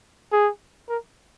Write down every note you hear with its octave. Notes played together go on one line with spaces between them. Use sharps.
G#4
A#4